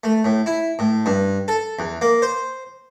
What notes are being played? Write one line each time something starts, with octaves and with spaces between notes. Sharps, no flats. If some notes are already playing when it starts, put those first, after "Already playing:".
A3
A2
E4
A2
G2
A4
E2
A#3
C5